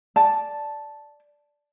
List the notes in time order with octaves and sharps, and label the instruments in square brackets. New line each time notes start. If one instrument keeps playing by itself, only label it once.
[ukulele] D5 A5